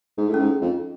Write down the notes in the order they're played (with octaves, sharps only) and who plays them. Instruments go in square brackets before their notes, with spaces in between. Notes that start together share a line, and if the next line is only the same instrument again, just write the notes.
[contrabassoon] G#2
A2
[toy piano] C#4
[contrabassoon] G#2
F2